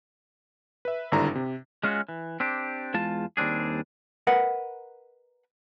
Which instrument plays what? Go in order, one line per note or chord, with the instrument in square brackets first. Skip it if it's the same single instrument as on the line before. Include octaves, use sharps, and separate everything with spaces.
[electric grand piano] B4 E5
G#1 G2 D3 D4 E4 A#5
C3
[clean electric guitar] G#3 C#4 F4 F#4
E3
C4 D4 G4
E2 G#3 F4 A5
D#2 G3 C4 D4 G#4
[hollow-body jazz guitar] A#4 B4 D#5 F#5